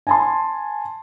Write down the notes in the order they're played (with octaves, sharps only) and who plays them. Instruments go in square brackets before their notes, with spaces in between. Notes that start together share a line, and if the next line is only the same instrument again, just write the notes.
[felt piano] G#5 A5 C6